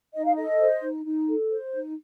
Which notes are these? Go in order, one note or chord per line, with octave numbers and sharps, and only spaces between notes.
D#4 D#5
F5
A4 D#5
C5
D#4
D#4
A4
C5
D#4